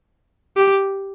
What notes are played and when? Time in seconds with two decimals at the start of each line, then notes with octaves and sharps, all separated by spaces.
0.57 G4